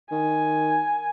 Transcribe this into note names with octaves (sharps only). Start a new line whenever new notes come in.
D#3 G#5